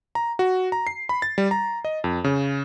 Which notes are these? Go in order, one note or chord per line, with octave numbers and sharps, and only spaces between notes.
A#5
F#4
A#5
C7
B5
A6
G3
A#5
D#5
F2
C#3